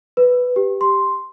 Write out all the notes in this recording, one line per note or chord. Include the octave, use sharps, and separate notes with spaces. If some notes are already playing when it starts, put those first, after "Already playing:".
B4
G4
C6